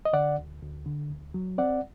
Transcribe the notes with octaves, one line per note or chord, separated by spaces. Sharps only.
D#5
D3 D5 F#5
D2
D2
D3
D2
F#3
C4 D5 F#5